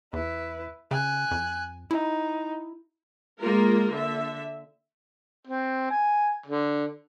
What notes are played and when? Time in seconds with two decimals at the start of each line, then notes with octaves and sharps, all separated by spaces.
0.13 E2 E4 B4
0.91 C#3 G#5 F#6
1.31 F2
1.91 D#4 E4
3.39 G#3 A#3 F4 A#4
3.91 D3 E5
5.47 C4
5.91 G#5
6.46 D3